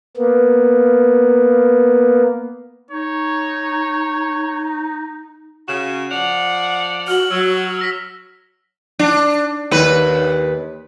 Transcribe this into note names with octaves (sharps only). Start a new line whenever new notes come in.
A#3 B3
D#4 C#5
C#3 F#4 E7
F3 D5 F#5 F7
F#4 F6 F#7
F#3 E6
E6 A#6 B6
D4
D#2 B4